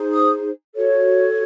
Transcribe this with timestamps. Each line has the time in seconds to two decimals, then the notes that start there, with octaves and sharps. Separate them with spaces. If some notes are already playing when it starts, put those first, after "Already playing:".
Already playing: D#4 G#4 C5
0.12 D#6
0.75 F#4 A4 C#5